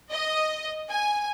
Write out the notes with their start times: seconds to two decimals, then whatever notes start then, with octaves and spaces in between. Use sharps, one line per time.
0.10 D#5
0.90 G#5